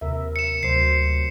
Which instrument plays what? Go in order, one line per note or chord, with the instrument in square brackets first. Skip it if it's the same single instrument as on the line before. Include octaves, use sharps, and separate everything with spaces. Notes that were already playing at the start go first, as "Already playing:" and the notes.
[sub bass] D#2 [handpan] C3 A#4 E5
[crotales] C#7 E7
[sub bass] D2 [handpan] C3 F#3 C5 [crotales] C7